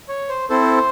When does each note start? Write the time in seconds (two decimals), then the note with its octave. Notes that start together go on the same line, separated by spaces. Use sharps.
0.08 C#5
0.29 C5
0.49 C4 E4 A4 C5